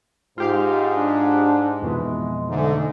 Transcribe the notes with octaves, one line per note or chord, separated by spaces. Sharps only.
G#2 F4 G4 F5
D4
F2 B2 E3 G#3
G#2 D3 A3